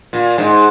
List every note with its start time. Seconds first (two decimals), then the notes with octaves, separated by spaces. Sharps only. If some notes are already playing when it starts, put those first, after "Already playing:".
0.13 A#2
0.38 G#2